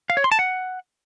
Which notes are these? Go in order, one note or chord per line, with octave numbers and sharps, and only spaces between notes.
F5
C#5
C6
A5
F#5